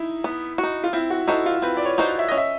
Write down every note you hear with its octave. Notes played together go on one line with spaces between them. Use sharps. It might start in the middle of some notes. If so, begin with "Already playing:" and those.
Already playing: D#4 E4
B3
F#4
D#4
F4
C4 E4
F#4
D#4 E4 F#4 A4 C5
F4
C4 B4
D5
C#5
D#4 F#4 A4 C5
E5
C#4 D#5
E5